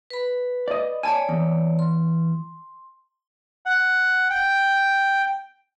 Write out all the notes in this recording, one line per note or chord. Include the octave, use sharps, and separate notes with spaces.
B4 B5
D5 D#5
C#5 D5 G#5 A5 B5
E2
C6
F#5
G5